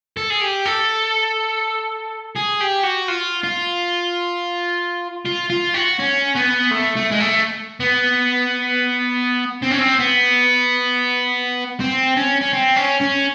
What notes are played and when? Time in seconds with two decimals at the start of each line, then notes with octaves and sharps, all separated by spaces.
0.17 A4
0.30 G#4
0.41 G4
0.66 A4
2.36 G#4
2.60 G4
2.83 F#4
3.08 F4
3.44 F4
5.26 F4
5.50 F4
5.74 F#4
5.99 C#4
6.36 B3
6.71 A3
6.96 A3
7.11 G#3
7.20 A3
7.80 B3
9.62 C4
9.71 C#4
9.79 C4
9.99 B3
11.80 C4
12.17 C#4
12.41 C#4
12.53 C4
12.77 C#4
13.01 C#4